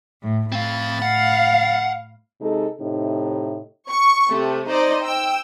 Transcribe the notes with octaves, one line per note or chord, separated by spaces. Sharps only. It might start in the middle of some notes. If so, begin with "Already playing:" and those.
A2
A2 C4 F5 B5 A6
F5 F#5
C3 G#3 D#4 A4
A2 C3 D#4
C#6
C3 A3
D#4 C5 D5 D#5
G5 E6